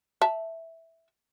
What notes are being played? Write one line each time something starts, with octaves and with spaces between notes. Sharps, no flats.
E5 A5